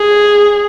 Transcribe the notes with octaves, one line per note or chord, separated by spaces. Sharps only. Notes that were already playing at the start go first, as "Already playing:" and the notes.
Already playing: G#4